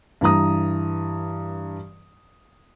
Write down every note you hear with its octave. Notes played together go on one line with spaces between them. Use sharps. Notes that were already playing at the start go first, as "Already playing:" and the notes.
G2 E3 A#5 D#6